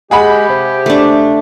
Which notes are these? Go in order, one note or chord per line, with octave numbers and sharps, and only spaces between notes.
G#3 G4 G#4 F#5 B5
C3
A3 D4